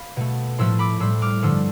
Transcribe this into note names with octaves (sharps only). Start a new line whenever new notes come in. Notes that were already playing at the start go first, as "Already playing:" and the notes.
Already playing: F5 B5
B2 A3
A2 F3 A3 C6 E6
B5 D6
A2 G3 C6 E6
D6 F6
G2 D3 F3 A3 C6 E6